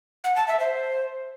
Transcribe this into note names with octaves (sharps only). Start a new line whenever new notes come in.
F#5
A5
E5
C5